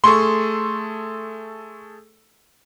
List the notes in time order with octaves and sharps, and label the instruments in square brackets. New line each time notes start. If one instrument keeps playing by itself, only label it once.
[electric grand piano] A3 G#4 A4 [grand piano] C6 C#6